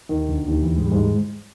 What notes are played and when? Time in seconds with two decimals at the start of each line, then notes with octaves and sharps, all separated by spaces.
0.09 D#2 D#3
0.29 D2 D3
0.48 D#2 D#3
0.62 E2 E3
0.77 G#2 G#3
0.85 G3
0.92 G#2 G#3